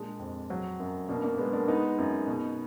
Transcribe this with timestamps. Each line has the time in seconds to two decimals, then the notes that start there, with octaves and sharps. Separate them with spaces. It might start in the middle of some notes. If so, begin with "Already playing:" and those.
Already playing: A#2 G#3 D4
0.19 F2
0.50 F#3
0.80 F#2
1.08 B2 A#3 D4
1.23 A#3 D4
1.38 G#3 B3
1.53 A#3 D4
1.68 G#3 B3 D#4
1.98 F#2
2.27 B2